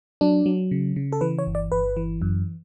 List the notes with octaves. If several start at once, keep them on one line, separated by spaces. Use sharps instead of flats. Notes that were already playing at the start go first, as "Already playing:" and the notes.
F#3 D4
F#3
C#3
C#3
A4
E3 B4
C#5
G1
D5
G1 B4
E3
F#2